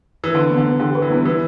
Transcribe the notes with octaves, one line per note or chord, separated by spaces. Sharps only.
E3
D3 B4
B3
D3
B3
D3 G4
B4
E3
G3 B3
E3 B3